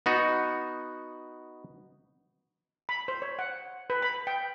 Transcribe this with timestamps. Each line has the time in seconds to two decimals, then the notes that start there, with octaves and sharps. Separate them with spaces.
0.06 B3 D#4 F#4
2.89 B5
3.08 C5
3.22 C#5
3.39 F#5
3.90 B4
4.02 B5
4.27 G5